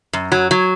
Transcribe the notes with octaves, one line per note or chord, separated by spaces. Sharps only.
F#2
F#3
F#3